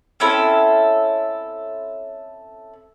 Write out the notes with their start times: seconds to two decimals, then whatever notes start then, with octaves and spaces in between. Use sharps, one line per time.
0.20 C4 C#4 E4 A4